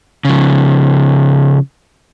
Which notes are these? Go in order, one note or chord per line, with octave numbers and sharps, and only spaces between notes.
C#3 F3